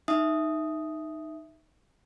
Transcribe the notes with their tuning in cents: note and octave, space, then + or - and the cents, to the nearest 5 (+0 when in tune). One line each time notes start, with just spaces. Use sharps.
D#4 -5 E5 +0 D#6 +0